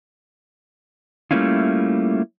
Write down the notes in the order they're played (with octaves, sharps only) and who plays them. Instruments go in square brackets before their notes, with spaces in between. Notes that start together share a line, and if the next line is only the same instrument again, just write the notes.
[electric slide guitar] G3 A3 A#3 C#4 E4 F4